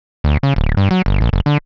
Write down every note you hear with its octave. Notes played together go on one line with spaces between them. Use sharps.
D2
C#3
D1
G2
F#3
G1
A#1
F#1
D3